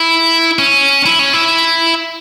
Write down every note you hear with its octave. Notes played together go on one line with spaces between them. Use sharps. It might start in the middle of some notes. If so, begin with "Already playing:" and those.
Already playing: E4
C#4
E4
C#4
E4